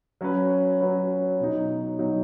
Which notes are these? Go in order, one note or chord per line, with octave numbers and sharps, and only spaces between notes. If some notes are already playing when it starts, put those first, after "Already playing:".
F#3 C#4 B4
F#3 C#4 B4
B2 F#3 D#4
B2 F#3 D#4